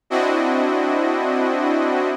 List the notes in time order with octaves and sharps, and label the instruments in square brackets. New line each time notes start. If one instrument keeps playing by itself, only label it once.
[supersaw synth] C4 D4 E4 F#4 D#5